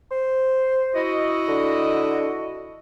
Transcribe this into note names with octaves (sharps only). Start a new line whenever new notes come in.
C5
E4 F#4 D#5
D3